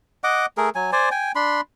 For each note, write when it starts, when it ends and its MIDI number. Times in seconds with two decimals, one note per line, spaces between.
0.24 0.46 75
0.24 0.46 78
0.24 0.46 86
0.57 0.69 57
0.57 0.69 68
0.57 0.69 70
0.75 0.91 54
0.75 0.91 80
0.92 1.09 72
0.92 1.09 74
0.92 1.09 80
1.11 1.32 79
1.11 1.32 80
1.35 1.61 62
1.35 1.61 83
1.35 1.61 84